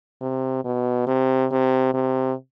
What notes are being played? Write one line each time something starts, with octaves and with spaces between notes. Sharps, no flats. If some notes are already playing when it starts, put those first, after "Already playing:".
C3
B2
C3
C3
C3